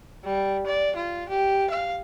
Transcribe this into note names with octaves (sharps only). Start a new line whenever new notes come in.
G3
D5
F4
G4
F5